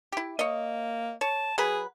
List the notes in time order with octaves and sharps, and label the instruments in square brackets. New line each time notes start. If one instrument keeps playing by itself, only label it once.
[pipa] E4 G4
[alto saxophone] A#3 [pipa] C#5 D#5
[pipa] C#5 [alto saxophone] A5
[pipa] F#3 B4 B5 [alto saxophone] G#4